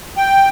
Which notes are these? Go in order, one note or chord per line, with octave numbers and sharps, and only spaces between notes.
G5